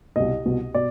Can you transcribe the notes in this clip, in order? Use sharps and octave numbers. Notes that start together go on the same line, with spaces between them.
C2 B2 D#5
C2 B2
B2 D5